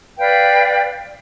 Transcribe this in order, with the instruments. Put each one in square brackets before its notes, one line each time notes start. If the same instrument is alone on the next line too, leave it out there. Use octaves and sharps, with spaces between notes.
[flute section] B4 D5 F5 G5